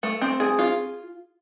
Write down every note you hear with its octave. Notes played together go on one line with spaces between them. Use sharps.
A3
C4
G#4
F4